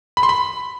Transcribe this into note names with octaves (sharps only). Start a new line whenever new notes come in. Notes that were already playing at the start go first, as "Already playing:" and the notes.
B5
C6
B5